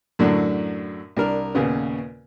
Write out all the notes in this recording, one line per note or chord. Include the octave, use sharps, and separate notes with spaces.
F#2 A2 D3 F#3 D4
C2 D4 A#4
D#2 A#2 C#3 B3